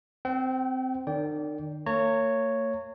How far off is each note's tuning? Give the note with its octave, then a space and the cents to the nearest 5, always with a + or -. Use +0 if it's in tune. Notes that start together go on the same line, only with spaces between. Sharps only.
C4 -10 G5 -45
D#3 -45 D5 -25 G5 +0
A#3 -45 C#5 +0 A#5 -35